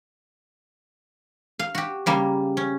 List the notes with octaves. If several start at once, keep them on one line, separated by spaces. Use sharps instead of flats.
F5
F#4 G4
C#3 G3 A#3
C#4